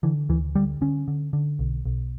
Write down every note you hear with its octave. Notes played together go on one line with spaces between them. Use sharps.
D3 E3
D2 E3
D3 G3
D3 C#4
D3
D3
B1
B1